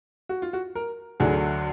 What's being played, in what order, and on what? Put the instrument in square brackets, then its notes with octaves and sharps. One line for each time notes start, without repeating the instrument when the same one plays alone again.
[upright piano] F#4
F4
F#4
A#4
D2 D3 F#3 G#4